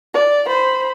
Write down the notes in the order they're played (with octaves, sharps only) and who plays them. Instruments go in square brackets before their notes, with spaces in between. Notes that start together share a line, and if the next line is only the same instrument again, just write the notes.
[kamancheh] D5
C5 B5